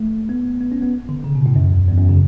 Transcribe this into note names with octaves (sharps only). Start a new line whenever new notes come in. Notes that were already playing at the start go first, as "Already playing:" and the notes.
Already playing: A3
B3
B3
C#4
B3
D3
C#3
B2
A2
F#2
E2
E2
F#2
C#3